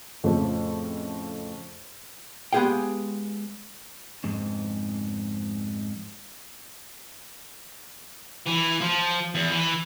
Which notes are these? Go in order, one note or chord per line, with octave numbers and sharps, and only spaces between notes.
F2 A2 C#3 F3
G#3 B3 G4 G#4 F5 G5
F2 G#2
E3
F3
E2
E3